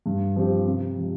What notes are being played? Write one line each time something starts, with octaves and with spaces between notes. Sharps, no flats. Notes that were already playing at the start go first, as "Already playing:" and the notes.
G2
F3 C4 G4
C3
F3 G#3